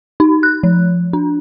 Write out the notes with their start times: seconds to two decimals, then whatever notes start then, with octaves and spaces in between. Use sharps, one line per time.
0.20 D#4
0.43 F#6
0.63 F3
1.13 D4